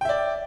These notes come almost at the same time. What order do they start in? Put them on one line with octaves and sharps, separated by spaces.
G5 E5 D5